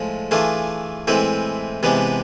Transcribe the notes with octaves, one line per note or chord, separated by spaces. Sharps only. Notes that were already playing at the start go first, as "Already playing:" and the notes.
Already playing: A2 F3 G#3
E3 A3 D4 F4 G#4
A2 E3 G#3 C4 E4
C3 E3 G#3 B3 D4